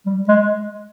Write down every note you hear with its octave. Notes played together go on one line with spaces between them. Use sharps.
G3
G#3